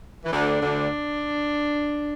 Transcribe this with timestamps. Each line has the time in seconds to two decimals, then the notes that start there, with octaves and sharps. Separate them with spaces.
0.24 E3
0.31 D2 D3 D4
0.61 D2 D3